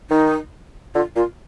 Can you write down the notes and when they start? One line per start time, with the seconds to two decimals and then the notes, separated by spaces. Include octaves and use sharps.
0.10 D#3 D#4
0.95 D3 F4
1.16 A#2 F4